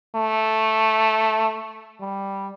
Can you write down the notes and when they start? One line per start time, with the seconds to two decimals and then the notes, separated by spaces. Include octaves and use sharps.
0.15 A3
2.01 G3